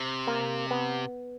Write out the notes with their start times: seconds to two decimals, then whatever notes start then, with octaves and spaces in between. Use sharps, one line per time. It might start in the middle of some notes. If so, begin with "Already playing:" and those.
Already playing: C3
0.27 A#3
0.71 B3